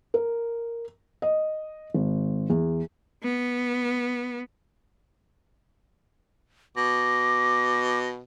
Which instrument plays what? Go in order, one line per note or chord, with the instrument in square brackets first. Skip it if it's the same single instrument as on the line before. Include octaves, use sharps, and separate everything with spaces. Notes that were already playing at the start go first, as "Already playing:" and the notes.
[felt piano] A#4
D#5
G#1
E2
[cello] B3
[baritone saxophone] B2 [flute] D6 [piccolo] A#6